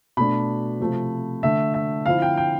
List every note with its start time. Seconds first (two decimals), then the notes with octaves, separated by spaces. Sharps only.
0.17 B2 A3 D4 B5
0.80 C3 F3 A3
1.43 D3 A3 D4 E5
1.74 E5
2.06 D3 F3 C4 E4 F5
2.22 G5
2.37 G5